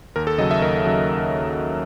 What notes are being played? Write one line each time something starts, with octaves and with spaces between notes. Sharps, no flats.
D#2 A#4
A4
C#3 F#3 D#5
E5
D#2 A#4
C#3 F#3